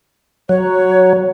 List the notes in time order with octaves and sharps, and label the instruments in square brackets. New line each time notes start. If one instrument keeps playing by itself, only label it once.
[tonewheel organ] F#3 [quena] C#5